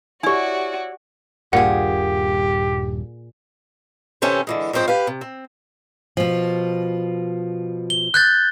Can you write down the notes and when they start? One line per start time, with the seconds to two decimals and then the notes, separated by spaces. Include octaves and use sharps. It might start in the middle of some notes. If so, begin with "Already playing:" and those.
0.23 E4 F#4 G4 C#5 D5 G#5
1.53 D#1 G2 A#2 G4 G#4 F#5
4.22 C3 E3 C#4 G4 A4 C5
4.47 D3 E3 G#3
4.73 G#2 F3 C4 C5 C#5
4.88 G4 B4 F5
5.07 C3
5.21 C4
6.17 B2 F3
7.90 G7
8.14 F#6 G6 A6